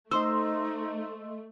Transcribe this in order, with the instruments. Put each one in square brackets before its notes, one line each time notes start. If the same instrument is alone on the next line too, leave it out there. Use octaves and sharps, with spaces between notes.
[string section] A3 [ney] D#4 [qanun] C5 [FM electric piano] D#5 C6 E6